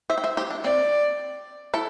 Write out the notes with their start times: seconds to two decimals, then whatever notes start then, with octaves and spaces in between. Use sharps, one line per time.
0.10 C5 E5
0.18 G5
0.24 C5 E5
0.37 G4 C5
0.51 D4
0.64 C4 D5
1.74 E4 A4